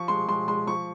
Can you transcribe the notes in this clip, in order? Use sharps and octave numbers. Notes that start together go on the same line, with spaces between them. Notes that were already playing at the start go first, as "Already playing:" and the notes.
Already playing: F3 C#6
G#3 C6
G#3 C6
G#3 C6
F3 C#6